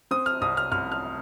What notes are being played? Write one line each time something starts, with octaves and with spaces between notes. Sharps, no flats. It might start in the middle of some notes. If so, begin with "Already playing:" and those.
C4 D#6
F6
C2 D#6
F6
C2 F6
F6